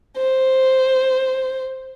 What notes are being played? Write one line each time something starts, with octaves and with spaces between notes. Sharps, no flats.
C5